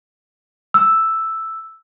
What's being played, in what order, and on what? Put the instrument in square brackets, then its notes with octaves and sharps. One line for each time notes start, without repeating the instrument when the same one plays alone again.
[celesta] E6